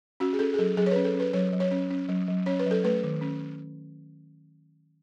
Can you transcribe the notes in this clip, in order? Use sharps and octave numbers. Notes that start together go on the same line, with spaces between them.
C#4 F#4
G#4
C#4 A4
G#4
F#3 A4
F#3 G#4
C#5
C#4 B4
A4
C#4
B4
F#3 C#5
F#3
C#5
C#4
C#4
F#3
F#3
C#4 C#5
B4
F#3
A4
A3 B4
D#3
C#4